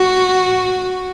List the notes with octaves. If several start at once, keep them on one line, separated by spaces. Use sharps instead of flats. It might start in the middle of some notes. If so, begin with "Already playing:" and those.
Already playing: F#4